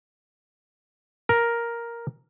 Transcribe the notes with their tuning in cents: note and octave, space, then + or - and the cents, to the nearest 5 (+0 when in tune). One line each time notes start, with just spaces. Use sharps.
A#4 +5